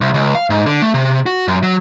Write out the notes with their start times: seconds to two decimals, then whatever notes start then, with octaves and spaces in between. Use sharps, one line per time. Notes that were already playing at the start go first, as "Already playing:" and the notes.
0.01 C2
0.14 C#2
0.35 F5
0.50 G#2
0.66 D3
0.82 A3
0.94 C3
1.26 F#4
1.48 F#2
1.63 F#3